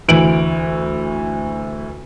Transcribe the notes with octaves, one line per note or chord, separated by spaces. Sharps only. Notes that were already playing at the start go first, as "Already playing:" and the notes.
D2 E3 D7 F#7